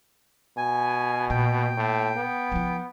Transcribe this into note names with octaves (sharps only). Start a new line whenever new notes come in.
B2 G#5
A#2 G5
A2
B3
F3 E4